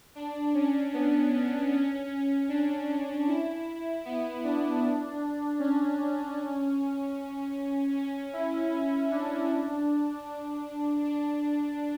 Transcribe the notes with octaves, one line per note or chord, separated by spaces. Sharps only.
D4
C#4
B3
C#4
C#4
C#4
D4
E4
B3
D4
C#4
C#4
E4
C#4
D4
D4